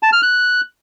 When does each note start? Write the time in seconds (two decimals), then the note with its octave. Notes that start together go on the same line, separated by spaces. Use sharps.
0.03 A5
0.13 F6
0.23 F#6